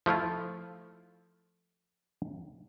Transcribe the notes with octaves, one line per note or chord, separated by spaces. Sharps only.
F3 A3 E4 F4